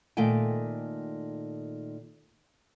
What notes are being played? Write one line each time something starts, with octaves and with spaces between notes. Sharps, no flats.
A#2 D#3 A3 F5 G5 G#5